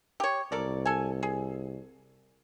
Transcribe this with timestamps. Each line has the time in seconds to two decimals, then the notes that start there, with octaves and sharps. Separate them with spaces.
0.20 G4 C#5
0.52 C2 A4 A#4 D5
0.85 A4 G#5
1.23 G#4